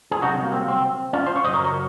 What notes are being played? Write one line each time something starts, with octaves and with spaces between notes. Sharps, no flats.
G#4
C2 C3 D#3 F#3 D#4 F#4
A#3
C4
C4
C#4 F4
C5
C#5
F#2 C#3 F#3 C5 D#5
A#4 C#5
A#4 C#5